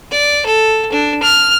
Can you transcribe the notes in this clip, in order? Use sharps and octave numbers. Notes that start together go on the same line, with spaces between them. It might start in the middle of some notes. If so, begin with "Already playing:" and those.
D5
A4
D4
F6